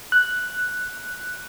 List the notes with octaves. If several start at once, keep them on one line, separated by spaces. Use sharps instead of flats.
F#6